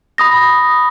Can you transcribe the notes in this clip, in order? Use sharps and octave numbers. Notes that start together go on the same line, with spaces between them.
B5 D#6 A#6